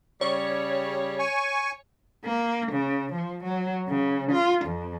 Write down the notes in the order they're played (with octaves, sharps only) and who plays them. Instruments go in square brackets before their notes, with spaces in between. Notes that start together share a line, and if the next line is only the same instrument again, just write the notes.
[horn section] C#3 G3 [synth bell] C#5
[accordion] G#5 C#6
[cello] A#3
C#3
F3
F#3
C#3
F4
F2